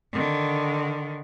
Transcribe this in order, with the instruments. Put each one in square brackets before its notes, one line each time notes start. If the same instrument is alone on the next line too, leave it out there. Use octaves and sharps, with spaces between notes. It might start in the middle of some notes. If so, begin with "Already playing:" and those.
[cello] D3 D#3